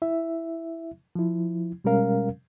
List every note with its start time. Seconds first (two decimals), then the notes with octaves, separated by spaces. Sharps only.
0.02 E4 E5
1.15 F3 E4
1.84 B2 G3 G#3 C#4 A#4 F5